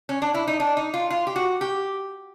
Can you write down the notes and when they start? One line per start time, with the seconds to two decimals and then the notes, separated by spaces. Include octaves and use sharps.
0.09 C#4
0.22 D4
0.34 E4
0.47 D#4
0.60 D4
0.77 D#4
0.94 F4
1.10 F4
1.27 G4
1.36 F#4
1.61 G4